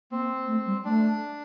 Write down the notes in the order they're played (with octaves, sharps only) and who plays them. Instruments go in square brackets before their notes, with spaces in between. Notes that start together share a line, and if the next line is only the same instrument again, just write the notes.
[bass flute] A#3 [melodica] C4
[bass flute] A3
G3
[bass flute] A3 [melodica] D4